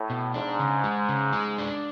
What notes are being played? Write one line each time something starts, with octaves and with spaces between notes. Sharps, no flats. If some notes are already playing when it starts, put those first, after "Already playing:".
Already playing: A2
B2
G#2 D4
C#3
G#3
C#3
G#3
D4